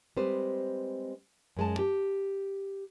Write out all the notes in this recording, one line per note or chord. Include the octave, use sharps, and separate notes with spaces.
G3 G#3 C4 B4 C5
F#2 G#3 A5
G4